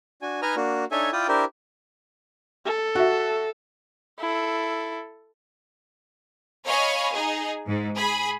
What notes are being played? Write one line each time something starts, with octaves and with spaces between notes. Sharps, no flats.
D4 F#4 G#5
D#4 B4 D#5 G#5 A#5 F6
A#3 D4 F#4
D4 D#4 A4 C#5 E5 G#5
E4 F4 D5 G5 D#6
D4 E4 G4 A#4 C5
A4
F#4 E5
E4 A4
C#5 D#5 F5 G#5 B5
D#4 G#4
G#2
G#4 B5